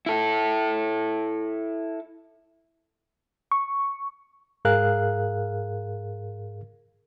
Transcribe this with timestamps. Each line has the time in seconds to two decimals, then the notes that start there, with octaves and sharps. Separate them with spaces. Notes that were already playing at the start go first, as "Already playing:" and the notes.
0.06 E4 A4
3.51 C#6
4.65 G#2 G#4 A#4 F5 F#6